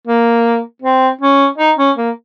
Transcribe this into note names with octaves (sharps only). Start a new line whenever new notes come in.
A#3
C4
C#4
D#4
C#4
A#3